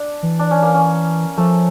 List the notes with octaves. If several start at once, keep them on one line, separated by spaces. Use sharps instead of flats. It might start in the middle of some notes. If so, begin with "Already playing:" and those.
Already playing: D4
E3
D4
C#4
A#3
C#4
F3 A3